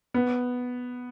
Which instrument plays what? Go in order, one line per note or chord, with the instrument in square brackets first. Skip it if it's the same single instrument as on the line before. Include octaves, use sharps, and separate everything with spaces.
[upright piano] B3